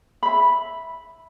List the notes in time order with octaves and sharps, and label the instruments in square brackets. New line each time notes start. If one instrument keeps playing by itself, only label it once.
[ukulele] E5 B5